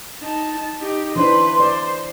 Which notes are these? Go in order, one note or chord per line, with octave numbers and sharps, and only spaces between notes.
D#4 A5
D#4 G4
E3 D4 B4 C5 C6
C5 D5